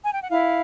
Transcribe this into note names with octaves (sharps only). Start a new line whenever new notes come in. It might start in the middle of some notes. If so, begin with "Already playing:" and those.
G#5
G5
F#5
E4 F5